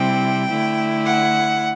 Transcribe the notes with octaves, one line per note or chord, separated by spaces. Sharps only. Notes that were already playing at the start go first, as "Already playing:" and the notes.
Already playing: C3 G3 C4 E4 G5
D3 A3 E4
F#5